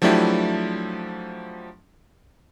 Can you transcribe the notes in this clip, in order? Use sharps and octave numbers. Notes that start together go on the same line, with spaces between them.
F3 F#3 A3 D4 E4 G4